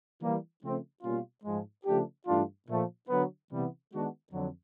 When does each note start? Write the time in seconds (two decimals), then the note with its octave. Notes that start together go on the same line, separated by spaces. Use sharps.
0.20 E3 G3 A#3
0.62 C#3 F3 A3 C4
1.03 B2 G3 A#3 C#4 F4
1.44 G#2 F3 G#3
1.86 C#3 F3 A3 D4 G4
2.27 G2 E3 A3 D4 F4
2.68 A#2 F3 A3
3.09 D3 F#3 B3
3.51 C3 E3 G3 B3
3.92 D#3 G#3 B3 D4 F#4
4.33 F2 D3 F#3